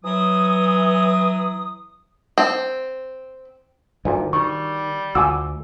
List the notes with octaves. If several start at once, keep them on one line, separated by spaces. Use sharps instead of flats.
E3 F#3 D#6
C4
D2 G2 A#2 D#3
D#3 G3 C#6
D2 F4 F#4 G#5 D6 E6